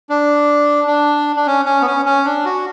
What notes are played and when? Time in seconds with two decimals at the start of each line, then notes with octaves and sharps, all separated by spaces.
0.09 D4
0.87 D4
1.36 D4
1.47 C#4
1.66 C#4
1.81 B3
1.86 C#4
2.06 C#4
2.25 D4
2.45 F#4